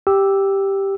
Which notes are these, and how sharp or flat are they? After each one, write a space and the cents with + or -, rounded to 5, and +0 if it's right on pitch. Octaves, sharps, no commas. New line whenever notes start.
G4 +0 E6 +0